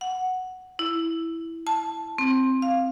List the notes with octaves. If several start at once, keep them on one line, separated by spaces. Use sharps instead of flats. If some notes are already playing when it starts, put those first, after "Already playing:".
F#5
E4
A5
C4
F5